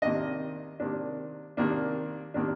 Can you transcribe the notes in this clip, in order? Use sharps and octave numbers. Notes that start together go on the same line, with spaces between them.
C3 D#3 A#3 D4 D#5
C3 D#3 A#3 D4
C3 D#3 A#3 D4
C3 D#3 A#3 D4